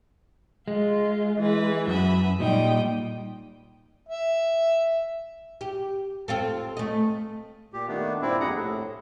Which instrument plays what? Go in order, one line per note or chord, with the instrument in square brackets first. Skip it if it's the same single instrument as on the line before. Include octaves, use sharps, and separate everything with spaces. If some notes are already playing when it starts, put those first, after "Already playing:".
[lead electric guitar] G#3 [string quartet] F4
[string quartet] E3 B4
[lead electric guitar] F#2 [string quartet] E5 B5 D#6
[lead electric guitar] A#2 D#4 [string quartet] G3 G5 D#6
[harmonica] E5
[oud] G4
C4 F4 A4
A3 D#5
[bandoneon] A#2 G4
D#3 A3 B3 D4
G2 A#2 C4 D4 E4
F2 C3 G#4 F#5 A#5
A2